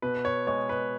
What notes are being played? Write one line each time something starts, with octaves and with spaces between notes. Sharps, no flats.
B2 B4
C#5
G#3 C#5
B4